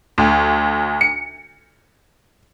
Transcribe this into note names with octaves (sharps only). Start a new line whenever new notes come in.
D2
C#7